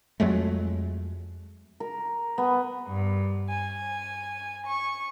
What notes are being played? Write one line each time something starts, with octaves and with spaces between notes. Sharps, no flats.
F2 F#3 G#3 A3
A#4
B3
G2
G#5
C#6